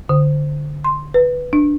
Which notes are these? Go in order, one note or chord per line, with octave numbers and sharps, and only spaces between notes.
D3
C6
B4
D4